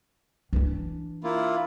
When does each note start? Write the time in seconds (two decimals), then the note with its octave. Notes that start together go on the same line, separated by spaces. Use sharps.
0.53 E3 D4
1.24 A#3 E4 F4